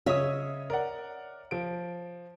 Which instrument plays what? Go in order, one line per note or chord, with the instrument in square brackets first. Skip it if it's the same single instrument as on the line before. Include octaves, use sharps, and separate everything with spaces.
[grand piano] C#3 D#6 [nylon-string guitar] C#5 D#5 E5
[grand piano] A#4 D5 F#5
F3 D7